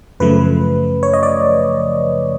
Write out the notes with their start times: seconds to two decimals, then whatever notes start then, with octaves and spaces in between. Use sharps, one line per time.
0.20 F#2 C#3 F3 A3 B4
1.03 C#5
1.13 D#5
1.23 D5